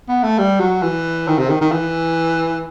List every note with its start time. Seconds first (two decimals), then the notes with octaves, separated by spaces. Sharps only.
0.08 B3
0.23 A3
0.38 G3
0.60 F#3
0.83 E3
1.28 D#3
1.39 C3
1.50 D#3
1.61 D#3
1.72 E3